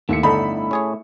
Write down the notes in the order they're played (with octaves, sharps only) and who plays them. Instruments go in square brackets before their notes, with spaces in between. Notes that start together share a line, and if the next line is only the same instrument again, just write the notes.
[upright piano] D#2 C#7 [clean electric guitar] A3 E4 E5
[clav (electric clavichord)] G1 D3 D#4 [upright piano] A4 B5
[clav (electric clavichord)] C#4 G#4 C#5